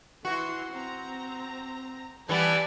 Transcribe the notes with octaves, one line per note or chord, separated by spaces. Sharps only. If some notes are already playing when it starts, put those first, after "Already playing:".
E3 F#4 C6
C4 A#5
E3 G3 B3 G4 D5 A5